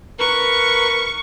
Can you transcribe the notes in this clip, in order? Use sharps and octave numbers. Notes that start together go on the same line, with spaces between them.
A#4 B4 C#6